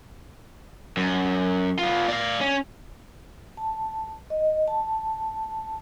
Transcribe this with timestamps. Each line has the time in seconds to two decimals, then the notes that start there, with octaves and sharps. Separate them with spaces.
0.97 F#2
1.79 B3 F4
2.08 D5 F5
2.41 C#4
3.57 A5
4.30 D#5
4.68 A5